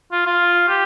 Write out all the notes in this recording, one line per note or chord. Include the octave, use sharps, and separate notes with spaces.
F4
F4
G4